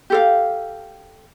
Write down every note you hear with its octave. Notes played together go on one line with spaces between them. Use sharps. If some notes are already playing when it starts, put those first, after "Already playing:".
G4 A4 F5